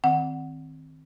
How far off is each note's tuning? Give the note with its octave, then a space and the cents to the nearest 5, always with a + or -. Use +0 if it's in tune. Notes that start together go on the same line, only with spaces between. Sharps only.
D#3 +0 C4 +0 F#5 +0